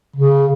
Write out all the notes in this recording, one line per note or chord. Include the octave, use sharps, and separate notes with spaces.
C#3